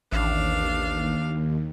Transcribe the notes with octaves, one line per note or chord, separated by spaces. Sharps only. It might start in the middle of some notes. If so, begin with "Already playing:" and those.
A1 D#2 D4 F5